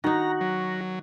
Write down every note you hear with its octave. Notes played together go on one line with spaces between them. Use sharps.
D#3 D#4 F#4 A#5
F#3